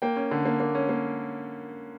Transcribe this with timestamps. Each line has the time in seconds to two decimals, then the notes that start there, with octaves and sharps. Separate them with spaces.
0.02 A#3 G5
0.16 C#4
0.31 D3
0.45 A#3
0.60 A#3
0.75 C#4
0.89 A#3